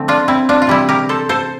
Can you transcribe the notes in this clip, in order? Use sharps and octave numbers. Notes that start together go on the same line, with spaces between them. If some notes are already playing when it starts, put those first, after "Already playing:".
Already playing: D3 F3 A3 C4
D4 F4
C4 E4
D4 F4
F4
C3 E3 G3 E4 G4
G4 A#4
A4 C5
A4 C5